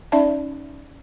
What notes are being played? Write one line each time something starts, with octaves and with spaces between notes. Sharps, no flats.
C#4 D#4 D5 E5 A5